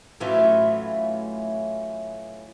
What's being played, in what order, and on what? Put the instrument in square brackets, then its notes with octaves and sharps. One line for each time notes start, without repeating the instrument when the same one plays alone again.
[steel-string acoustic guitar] A2 E3 F#3 A3 C#4 F4